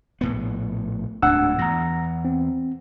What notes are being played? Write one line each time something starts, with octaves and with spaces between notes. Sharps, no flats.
A#1 A2 B3
D1 D2 G#2 D4 F#5 E6
E2 A#5 A#6
C4